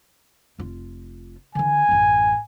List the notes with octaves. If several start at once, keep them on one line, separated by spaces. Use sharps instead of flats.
F1 F4
D3 E3 G#5
A1 F#2